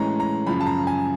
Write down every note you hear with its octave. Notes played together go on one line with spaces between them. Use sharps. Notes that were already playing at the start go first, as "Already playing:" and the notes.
Already playing: A2 E3 G#3 C#4 A#5
A#5
F#2 C#3 F3 B5
A5
A#5
G#5